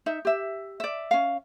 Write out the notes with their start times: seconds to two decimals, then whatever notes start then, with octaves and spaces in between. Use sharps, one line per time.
0.06 D#4 E5
0.25 G4 E5
0.80 D5 E5
1.11 C#4 F5